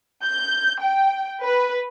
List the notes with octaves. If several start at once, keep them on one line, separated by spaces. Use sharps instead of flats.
G6
G5
B4